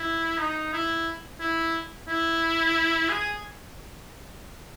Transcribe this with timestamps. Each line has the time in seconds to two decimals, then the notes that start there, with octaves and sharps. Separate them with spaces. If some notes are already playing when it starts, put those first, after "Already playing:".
Already playing: E4
0.39 D#4
0.73 E4
1.40 E4
2.08 E4
3.09 G#4